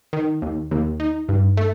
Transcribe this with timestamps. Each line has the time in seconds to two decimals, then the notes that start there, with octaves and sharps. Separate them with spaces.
0.13 D#3
0.42 D#2
0.71 D#2
1.00 D#4
1.29 G2
1.57 A3